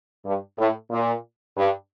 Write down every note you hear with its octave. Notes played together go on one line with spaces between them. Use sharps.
G2
A2
A#2
G2